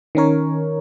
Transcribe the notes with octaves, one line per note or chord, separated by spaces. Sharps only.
D#3 C#4 A#4 C#5